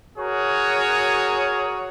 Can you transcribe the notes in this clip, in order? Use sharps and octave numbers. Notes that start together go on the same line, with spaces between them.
F#4 G#4 A#4 C#5